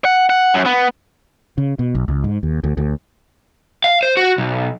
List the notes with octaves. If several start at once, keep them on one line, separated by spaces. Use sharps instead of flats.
F#5
F#5
F#2
B3
C#3
B2
B1
C#2
G#2
D#2
D2
D2
F5
C5
F#4
B1